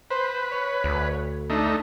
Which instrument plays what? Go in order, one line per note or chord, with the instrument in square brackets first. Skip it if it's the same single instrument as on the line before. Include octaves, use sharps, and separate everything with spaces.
[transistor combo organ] B4 [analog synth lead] C5
[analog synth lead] C#5
[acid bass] D2
[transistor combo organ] A3 D#4 [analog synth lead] D4